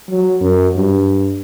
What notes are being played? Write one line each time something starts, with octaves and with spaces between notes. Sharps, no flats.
F#3
F#2
G2